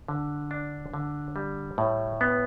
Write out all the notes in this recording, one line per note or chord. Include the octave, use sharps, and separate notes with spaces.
D3
D4
D3
G3
A2
B3